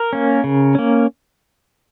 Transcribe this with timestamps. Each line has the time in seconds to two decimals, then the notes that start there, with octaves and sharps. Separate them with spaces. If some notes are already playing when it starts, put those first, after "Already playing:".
Already playing: A#4
0.13 A#3 C#4
0.44 C#3
0.75 A#3 C#4